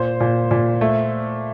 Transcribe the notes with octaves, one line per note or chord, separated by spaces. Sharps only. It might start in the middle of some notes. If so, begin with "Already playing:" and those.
Already playing: A#2 C5
A#2
A#2
A3